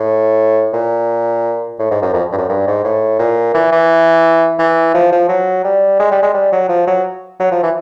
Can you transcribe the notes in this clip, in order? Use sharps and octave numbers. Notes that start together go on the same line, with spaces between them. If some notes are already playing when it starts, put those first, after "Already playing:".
Already playing: A2
A#2
A2
G#2
F#2
F2
G2
F#2
G2
G#2
A2
A#2
E3
E3
E3
F3
F3
F#3
G3
G#3
G3
G#3
G3
F#3
F3
F#3
F#3
F3
E3